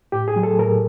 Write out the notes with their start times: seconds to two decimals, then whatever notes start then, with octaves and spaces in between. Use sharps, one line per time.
0.12 A2 G4
0.28 G#4
0.36 F#3
0.43 A4
0.59 A2 A#4